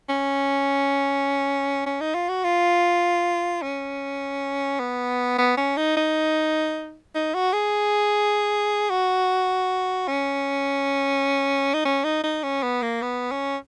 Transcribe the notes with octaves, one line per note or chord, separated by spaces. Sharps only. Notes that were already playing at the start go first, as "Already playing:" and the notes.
C#4
C#4
D#4
F4
F#4
F4
C#4
B3
B3
C#4
D#4
D#4
D#4
F#4
G#4
F#4
C#4
D#4
C#4
D#4
D#4
C#4
B3
A#3
B3
C#4